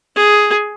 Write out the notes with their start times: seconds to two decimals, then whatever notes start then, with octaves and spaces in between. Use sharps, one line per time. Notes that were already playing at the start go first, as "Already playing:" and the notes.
0.16 G#4